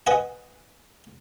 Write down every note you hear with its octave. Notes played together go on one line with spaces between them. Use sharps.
B4 D#5 F#5 G#5